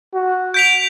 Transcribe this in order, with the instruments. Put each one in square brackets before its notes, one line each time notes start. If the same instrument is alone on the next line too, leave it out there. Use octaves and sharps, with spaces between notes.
[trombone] F#4
[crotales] G6 B6 F7 [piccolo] D7